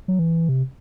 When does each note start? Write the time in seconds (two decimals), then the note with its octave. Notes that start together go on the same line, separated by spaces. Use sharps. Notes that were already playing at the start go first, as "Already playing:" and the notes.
0.08 F#3
0.19 E3
0.49 C3